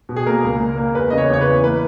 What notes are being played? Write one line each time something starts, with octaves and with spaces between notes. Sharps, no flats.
B2
G#4
A#3 A#4
C#2
A#3
A#3
E2 B4
C#3 D#5
C#5
E2 C#5
B4
E3
A#3 B4